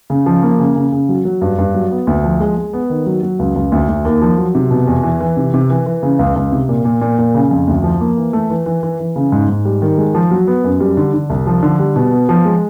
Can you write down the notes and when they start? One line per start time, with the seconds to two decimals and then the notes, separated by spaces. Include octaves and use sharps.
0.10 C#3
0.26 F3
0.43 A#3
0.59 C#3
0.76 C#3
0.92 C#3
1.09 F#3
1.25 F#3
1.41 G2
1.58 G2
1.74 F#3
1.91 B3
2.07 D2
2.24 F3
2.40 G#3
2.57 G#3
2.73 B3
2.90 D#3
3.06 F#3
3.23 F#3
3.39 C#2
3.56 C#2
3.72 D2
3.89 D2
4.05 D#2
4.22 F3
4.38 F#3
4.55 C3
4.71 B2
4.87 E2
5.03 E3
5.20 E3
5.37 C3
5.54 C3
5.70 E3
5.86 E3
6.03 C#3
6.19 C#2
6.36 C#2
6.52 C3
6.69 A#2
6.85 A#2
7.01 A#2
7.19 A#2
7.34 C#3
7.51 F2
7.68 D2
7.84 F3
8.00 A#3
8.17 E3
8.33 A3
8.50 E3
8.66 E3
8.83 E3
8.99 E3
9.16 C#3
9.32 G#2
9.49 G#2
9.65 G3
9.82 D#3
9.98 G#3
10.15 F3
10.31 F#3
10.47 B3
10.64 F#2
10.80 G3
10.97 D3
11.14 D3
11.30 C2
11.46 F3
11.63 D3
11.79 G3
11.96 B2
12.12 B3
12.29 F3
12.45 G#3